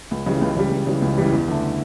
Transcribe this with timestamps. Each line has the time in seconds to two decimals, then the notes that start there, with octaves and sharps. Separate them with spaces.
0.11 C#2
0.26 C#3 E3 G3
0.41 C#2
0.56 C#3 E3 G3
0.71 C#2
0.87 C#3 E3 G3
1.02 C#2
1.18 C#3 E3 G3
1.32 E2
1.48 D3 A3